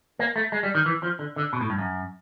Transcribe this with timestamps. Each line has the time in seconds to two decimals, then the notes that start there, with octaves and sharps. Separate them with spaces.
0.19 A#3
0.36 A3
0.52 G#3
0.63 G3
0.75 D#3
0.86 E3
1.03 F3
1.19 D3
1.36 D3
1.53 B2
1.61 A2
1.70 G2
1.78 F#2